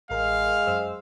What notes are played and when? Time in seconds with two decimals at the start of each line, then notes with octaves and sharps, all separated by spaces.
0.11 A1 G#3 A#4 F5
0.67 F#2 C5 E6